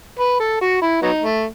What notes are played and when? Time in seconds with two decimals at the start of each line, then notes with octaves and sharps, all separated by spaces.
0.19 B4
0.39 A4
0.61 F#4
0.81 E4
1.02 F#3 B3 D#4
1.23 A3